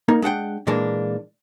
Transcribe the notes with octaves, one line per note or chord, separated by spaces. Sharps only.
A#3 D#4 A#4
G#3 D4 F#5 G5
A#2 E3 G#3 A#3 D4